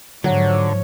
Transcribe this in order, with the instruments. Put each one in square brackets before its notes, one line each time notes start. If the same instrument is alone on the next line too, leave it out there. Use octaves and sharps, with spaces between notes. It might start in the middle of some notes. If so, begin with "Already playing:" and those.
[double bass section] G#2 F3 [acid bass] D3 [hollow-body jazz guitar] F#3 [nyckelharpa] C#5